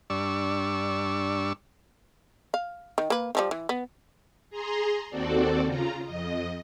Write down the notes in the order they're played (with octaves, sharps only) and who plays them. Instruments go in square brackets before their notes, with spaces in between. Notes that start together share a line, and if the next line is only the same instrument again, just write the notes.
[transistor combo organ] G2 D4 C#6 E6
[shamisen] F5
D#3
A#3 B4
D#3 F3 G3
E3
B3
[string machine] G#4 A#5 C6
D#2 C4 F#4 A4 D5
C#3 F4 A#5
F2 D#5